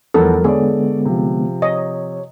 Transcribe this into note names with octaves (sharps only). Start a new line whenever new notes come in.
E2 F3 G3 B3 A4 A#4
D3 G#3 B3 G#4 A4 C#5 D5
C3 F3
C#5 D#5